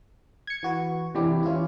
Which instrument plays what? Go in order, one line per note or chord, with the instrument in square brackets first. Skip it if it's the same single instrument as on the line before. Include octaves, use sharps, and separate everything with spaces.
[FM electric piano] G#6 C#7
E3 F#4 B4
[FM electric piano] C3 D4 [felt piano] E3 E4 G4
[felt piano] E3 C#4 [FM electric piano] E4 F4